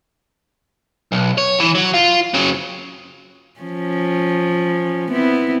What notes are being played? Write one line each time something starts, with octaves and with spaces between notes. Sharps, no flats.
B1
C#5
E3
F#3
F4
C#3 F#3
F3 C#4
B3 C4 E4